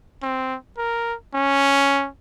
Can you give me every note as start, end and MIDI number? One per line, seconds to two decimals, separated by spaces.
0.23 0.56 60
0.77 1.15 70
1.34 2.08 61